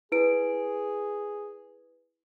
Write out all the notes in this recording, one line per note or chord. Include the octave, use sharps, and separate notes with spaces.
E4 G#4 B4 D7